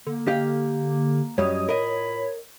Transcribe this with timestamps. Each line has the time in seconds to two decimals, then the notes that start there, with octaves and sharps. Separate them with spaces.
0.07 D3 A#3
0.27 G4 D#5 F5
1.38 F#2 G3 C#5 D#5 D#6
1.68 A2 F4 A#4 D#5 B5